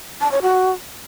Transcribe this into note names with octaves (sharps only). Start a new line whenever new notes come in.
A5
C#5
F#4